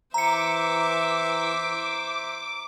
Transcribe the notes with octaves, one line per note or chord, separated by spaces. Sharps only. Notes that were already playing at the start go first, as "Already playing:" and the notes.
E3 C5 E5 A#5 D6 C#7